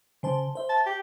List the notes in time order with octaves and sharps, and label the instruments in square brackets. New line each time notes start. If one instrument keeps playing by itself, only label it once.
[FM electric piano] C#3 C5 A5
C5 E5
[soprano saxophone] A5
G4